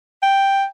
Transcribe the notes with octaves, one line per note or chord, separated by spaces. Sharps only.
G5